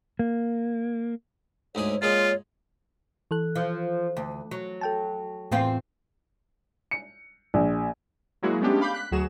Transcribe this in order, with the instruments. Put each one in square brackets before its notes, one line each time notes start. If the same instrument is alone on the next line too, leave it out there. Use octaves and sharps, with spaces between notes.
[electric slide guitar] A#3
[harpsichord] D2 G#2 G#4 [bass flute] C#5
[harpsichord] A#2 G#3 G#4 [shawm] F4 [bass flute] C#5
[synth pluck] E3 A4 F#6
[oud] F3
D2
F#3
[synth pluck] A4 G5 A5
[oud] E2 C4 F4 [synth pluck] A2
[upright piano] C#7
A#1
[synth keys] F#3 G#3 A#3 E4 F#4 G#4
G#3 A3 B3 C#4 D4 G4
F5 B5 D6 G6 B6
F#6 B6
D2 F#3 F#4 G#4 E7